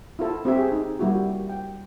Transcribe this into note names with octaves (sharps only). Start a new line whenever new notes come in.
E4 F4 A4
C4 G4 E5
G#4
D#4
G3 A#3 E4 F#4 G4
G5